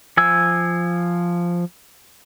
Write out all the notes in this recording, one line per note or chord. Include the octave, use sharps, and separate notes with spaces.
F3 G#5 E6